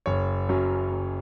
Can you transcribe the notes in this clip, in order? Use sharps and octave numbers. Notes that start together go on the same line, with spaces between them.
F#1 C#5
F#2 F#3 C#4
F#1